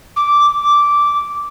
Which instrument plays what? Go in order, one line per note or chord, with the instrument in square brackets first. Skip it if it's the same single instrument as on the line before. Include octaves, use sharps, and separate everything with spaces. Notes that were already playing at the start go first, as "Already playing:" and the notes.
[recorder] D6